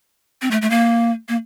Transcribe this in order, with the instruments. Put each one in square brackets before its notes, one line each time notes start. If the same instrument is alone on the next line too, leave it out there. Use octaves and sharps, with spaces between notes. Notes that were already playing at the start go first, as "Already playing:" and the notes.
[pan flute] C4
A3
A3
A#3
A#3